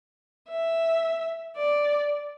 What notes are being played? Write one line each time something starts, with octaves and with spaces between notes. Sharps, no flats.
E5
D5